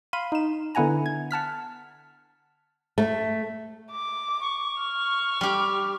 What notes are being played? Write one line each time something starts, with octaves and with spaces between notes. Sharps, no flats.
F5 B5 C6 D#7
D#4 E7
D3 B3 E4 F#5 G#5 A#5
G#6
F#5 A5 F6 B6
A3
D6
C#6
F6
G3 G4